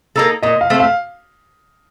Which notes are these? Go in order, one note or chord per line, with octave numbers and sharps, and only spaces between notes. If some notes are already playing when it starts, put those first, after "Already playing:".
A#3 D#4 A4
A#2 D#5
F5
A3 C4
F5